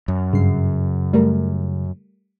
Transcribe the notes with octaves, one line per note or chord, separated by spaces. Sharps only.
F#2
G2 C#3 C7
G3 A3 A#4